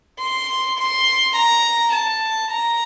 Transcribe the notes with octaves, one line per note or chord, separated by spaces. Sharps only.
C6
C6
A#5
A5
A#5